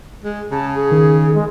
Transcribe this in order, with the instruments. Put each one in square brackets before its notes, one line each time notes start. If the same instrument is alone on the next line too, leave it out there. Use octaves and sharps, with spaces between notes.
[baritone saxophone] G#3
[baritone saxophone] C#3 [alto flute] A5
[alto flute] G#4
[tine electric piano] D#3
[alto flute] G#3